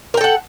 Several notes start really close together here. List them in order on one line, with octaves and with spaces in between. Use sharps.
A#4 G5 A4 F#5